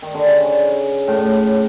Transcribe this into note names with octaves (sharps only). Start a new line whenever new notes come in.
D#3
D3
C#3
A2